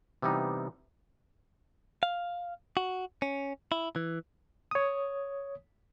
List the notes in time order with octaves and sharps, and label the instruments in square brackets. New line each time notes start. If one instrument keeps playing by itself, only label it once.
[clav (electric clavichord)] C3 E3 G3 B3 D#4
[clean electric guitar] F5
F#4
C#4
E4
E3
[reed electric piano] C#5 D#6